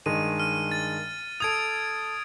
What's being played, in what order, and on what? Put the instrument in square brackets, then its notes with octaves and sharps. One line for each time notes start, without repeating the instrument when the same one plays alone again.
[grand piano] G2 D#3 G#3 [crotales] D#7
[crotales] F6 D#7
A6
[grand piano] A4 F7 [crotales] D#6 G#6 D7